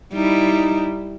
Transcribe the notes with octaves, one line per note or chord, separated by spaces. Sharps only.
G3 D#4 E4